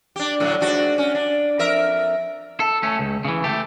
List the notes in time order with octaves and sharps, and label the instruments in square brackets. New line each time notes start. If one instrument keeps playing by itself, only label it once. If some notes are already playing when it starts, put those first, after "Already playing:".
[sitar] D4 G4
A2 D3 F#3
G#2 D4 F#4
C#4
D4
F2 A#4 E5
[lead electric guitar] A4
A3 C#4
C#2
C#3 E3
A3 G4